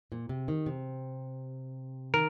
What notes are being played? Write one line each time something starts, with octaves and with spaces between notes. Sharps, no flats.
A#2
C3
D#3
C3
D#3 A#4